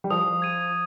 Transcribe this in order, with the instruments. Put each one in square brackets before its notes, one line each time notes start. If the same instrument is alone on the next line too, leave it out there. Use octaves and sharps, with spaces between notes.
[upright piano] G3
[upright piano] F3 [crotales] D#6
[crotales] G#6 D#7